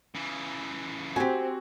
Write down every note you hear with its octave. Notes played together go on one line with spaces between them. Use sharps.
C#3 E3
C4 F#4 G4 G#5